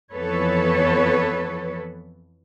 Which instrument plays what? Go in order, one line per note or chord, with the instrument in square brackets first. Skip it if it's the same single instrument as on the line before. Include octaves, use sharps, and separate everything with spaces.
[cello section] F2 E3 B3 A4 B4 C#5